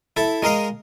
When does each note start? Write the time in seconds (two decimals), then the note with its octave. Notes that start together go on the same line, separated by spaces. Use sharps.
0.17 E4 A4
0.43 G#3 A#4 D#5 F5